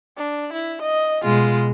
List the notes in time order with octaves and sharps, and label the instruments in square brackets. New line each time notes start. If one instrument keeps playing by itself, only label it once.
[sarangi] D4
E4
D#5
[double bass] B2 [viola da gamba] G#3 [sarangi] F4